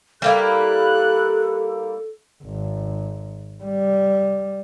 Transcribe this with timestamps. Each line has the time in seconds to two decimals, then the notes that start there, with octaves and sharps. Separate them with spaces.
0.22 G3 A#3 E4 A4 F#6
2.44 G#1
3.63 G3